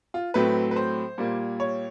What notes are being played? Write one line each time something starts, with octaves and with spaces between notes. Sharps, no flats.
F4
A2 F#3 A3 C4 B4
B4
C5
A#2 G3 A#3
C#5